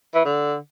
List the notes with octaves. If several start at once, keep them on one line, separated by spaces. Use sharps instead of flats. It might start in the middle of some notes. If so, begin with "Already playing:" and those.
E3
D3